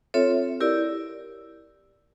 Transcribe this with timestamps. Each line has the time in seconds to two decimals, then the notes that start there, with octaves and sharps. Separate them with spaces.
0.14 C4 F4 A4 C#5 E5
0.61 E4 G4 A#4 D5